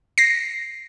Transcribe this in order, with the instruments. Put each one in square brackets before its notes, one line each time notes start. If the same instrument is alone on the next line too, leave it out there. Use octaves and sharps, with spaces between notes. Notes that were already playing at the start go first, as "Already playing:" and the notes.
[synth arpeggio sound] A#6 C7